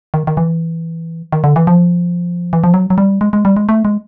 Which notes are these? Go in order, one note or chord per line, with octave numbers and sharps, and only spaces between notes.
D#3
D#3
E3
D#3
D3
E3
F3
E3
F3
F#3
F#3
G3
G#3
G#3
G3
G#3
A3
G#3